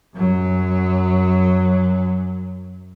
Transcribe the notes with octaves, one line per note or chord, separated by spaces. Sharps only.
F#2 F#3